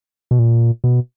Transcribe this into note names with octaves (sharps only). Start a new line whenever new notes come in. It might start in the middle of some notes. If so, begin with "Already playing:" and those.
B2
A#2
B2